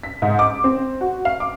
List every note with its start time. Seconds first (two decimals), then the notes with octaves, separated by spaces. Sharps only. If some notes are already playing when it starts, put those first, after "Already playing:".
0.03 B6
0.22 G#2
0.39 D6
0.64 C4
1.01 F#4
1.25 F5
1.40 D6